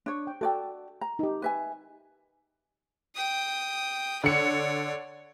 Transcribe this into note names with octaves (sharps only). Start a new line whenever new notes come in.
D4 C#5
G5
F#4 A4 D5 G5
A#5
D#4 G4
B4 E5 G#5
G5 D#6
D3 C#5 D5 C#7